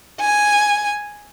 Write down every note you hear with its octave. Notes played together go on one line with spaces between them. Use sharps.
G#5